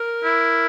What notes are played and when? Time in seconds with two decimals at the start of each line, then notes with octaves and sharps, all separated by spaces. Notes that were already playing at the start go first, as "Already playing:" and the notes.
Already playing: A#4
0.24 E4